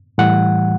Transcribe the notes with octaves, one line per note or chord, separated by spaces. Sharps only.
A2 E3 G3 F#5